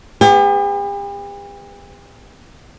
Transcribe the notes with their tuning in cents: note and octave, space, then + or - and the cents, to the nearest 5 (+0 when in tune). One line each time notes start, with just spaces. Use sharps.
B3 +20 G4 +45